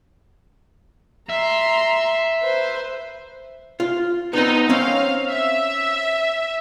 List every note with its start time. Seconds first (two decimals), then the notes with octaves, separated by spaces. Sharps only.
1.30 E5 A#5 C6
2.43 B4 C5
3.80 F4
4.33 B3 C4 D#4
4.70 C4 C#4 C#5 F5
5.29 E5